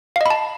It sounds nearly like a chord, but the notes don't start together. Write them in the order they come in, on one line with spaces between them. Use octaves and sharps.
F5 D#5 B5 A5